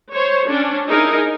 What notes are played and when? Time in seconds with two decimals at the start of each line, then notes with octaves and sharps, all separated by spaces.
0.14 C5 C#5
0.50 C#4 D4
0.87 D#4 E4 G#4 A#4 D#5